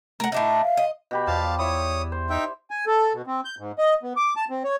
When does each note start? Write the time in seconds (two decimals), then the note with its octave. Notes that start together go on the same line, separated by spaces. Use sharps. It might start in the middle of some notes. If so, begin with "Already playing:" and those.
0.20 A3 A#4 F#5
0.32 A2 D4 D#4 E5
0.62 F5
0.77 D#5
1.11 B2 G4 B5
1.27 E2 F3 D5 F5 A5
1.59 E4 C#5 E5 D#6
2.12 C5
2.30 D#4 E5 G5
2.70 G#5
2.87 A4
3.14 B2
3.27 C4
3.45 G6
3.59 G#2
3.78 D#5
4.03 B3
4.17 D6
4.36 A5
4.50 C4
4.64 C#5